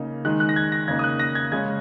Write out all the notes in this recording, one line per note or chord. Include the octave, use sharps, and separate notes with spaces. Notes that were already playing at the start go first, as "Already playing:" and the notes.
Already playing: C#3 A#3 D#4
D#3 G#3 D#4 F#6
F#6
A#6
G#6
A#6
C#3 A#3 D#4 G#6
D#6
F#6
A#6
G#6
C#3 G#3 C#4 G#6